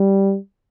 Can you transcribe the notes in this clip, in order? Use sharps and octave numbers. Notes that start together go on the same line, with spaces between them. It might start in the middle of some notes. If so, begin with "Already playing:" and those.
Already playing: G3